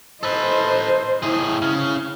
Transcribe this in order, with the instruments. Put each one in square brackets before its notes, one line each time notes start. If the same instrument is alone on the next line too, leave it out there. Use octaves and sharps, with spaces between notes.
[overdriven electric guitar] A4 B4 [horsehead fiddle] C5 D#5
[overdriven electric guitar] A2 G#4 [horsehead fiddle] E4
[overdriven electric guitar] C#3 C#4